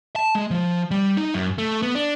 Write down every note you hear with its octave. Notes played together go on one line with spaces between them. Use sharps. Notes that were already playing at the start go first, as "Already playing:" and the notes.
A5
G#3
F3
G3
D#4
F#2
A3
B3
D4